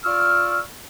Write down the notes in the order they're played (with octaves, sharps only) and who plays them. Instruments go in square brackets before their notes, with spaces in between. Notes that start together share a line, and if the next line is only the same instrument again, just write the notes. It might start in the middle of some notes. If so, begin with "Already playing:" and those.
[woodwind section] F4 D5 C#6 E6 F6